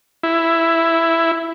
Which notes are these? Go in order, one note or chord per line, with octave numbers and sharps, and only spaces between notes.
E4